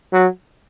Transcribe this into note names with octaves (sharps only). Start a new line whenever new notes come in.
F#3